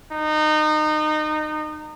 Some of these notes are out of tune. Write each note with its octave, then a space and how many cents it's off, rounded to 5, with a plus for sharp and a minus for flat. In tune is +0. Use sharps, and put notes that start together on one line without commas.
D#4 -25